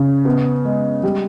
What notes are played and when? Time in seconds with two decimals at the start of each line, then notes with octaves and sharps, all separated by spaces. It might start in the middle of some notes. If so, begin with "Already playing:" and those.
Already playing: C#3
0.25 B3
0.65 G#3
1.03 G3